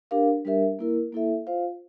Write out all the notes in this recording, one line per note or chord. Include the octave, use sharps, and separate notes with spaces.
D4 G4 A#4 F5
G3 D4 G4 A#4 E5
A#3 E4 A#4
A#3 E4 A4 E5
F4 C5 F5